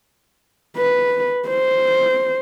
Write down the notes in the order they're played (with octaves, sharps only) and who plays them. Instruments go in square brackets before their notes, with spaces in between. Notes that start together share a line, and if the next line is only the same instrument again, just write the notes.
[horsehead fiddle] B4
C5